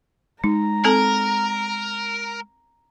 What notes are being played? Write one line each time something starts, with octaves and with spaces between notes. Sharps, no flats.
G#3 D#4 A#5
C4 A4 A#4 A5